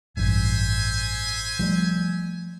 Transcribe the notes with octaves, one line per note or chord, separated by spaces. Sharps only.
A1 G2 C5 E5 G#5
F3 G3 A3